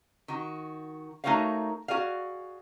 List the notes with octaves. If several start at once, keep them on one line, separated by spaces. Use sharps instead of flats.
D#3 F#4
A3 D#4 F#4 A#4 C#5 F5
F#4 G#4 D5 F5